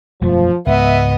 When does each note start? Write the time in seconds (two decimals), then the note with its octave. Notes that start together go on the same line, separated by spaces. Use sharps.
0.21 E1 F#2 F3 A3
0.66 C#2 G#2 B3 D#5 E5